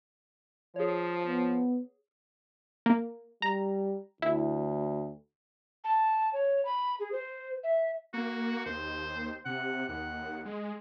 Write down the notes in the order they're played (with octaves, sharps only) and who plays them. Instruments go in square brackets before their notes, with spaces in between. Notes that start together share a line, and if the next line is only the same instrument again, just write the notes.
[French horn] F3 [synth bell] G#4 C#5
[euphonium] B3
[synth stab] A#3
[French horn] G3 [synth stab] A#5
[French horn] D2 [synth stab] E4
[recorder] A5
C#5
B5
G#4
C5
E5
[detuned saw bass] A#3 [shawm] F#4
[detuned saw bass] D#2 [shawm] C5
[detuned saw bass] C3 [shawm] F#5
[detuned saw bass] D#2 [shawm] F#5
[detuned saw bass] G#3